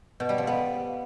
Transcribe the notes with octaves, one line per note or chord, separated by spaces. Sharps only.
B2
G3
F3
B3